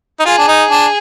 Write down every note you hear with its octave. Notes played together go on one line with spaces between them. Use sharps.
D#4
F4 G#4
D4
D#4
D4